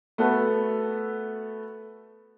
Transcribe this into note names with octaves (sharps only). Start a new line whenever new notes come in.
A3 B3 F#4 A4 B4